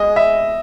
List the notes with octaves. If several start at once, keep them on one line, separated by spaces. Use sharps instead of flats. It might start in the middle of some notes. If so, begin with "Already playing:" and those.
Already playing: G#3 D#5
E5